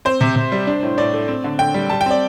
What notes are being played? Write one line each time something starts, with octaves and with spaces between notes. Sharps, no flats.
C4 C5
C3
C3
G3
D4
A2
A2 D5
A3
C4
D3
D3 G5
G3
G3 A5
G5
C4 D5